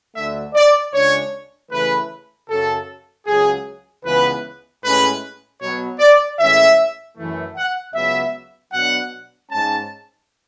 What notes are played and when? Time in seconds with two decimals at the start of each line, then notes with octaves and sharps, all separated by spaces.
0.15 D2 D3 A3 E5
0.55 D5
0.93 C#2 C#3 G#3 D4 C#5
1.71 C#3 E3 A3 B4
2.49 F#2 C#3 F#3 C#4 A4
3.27 C#2 C#3 F#3 C#4 G#4
4.05 C#2 C#3 E3 B3 B4
4.83 A2 G#3 C#4 B4
5.61 B2 F#3 B3 C#5
6.00 D5
6.39 A2 E3 G#3 C#4 E5
7.17 F#2 E3 A3
7.56 F#5
7.94 C#2 C#3 F#3 B3 E5
8.72 B2 F#3 B3 D4 F#5
9.50 G#2 G#3 C#4 A5